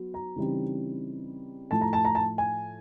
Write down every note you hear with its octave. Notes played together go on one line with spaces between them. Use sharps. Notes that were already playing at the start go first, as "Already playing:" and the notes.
Already playing: F#3 B3
A#5
C#3 E3 G3 C4 D#4
A2 F3 A3 A5
A#5
A5
A#5
A5
G#5